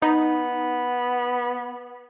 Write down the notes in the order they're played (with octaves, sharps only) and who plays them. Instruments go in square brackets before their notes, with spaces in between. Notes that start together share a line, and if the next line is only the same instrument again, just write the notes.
[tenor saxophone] B3 [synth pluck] D#4